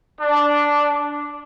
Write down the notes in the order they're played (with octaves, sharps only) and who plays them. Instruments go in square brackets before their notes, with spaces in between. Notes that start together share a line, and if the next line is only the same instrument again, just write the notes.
[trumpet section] D4